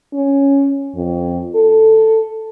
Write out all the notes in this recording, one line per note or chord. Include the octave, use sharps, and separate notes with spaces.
C#4
F2
A4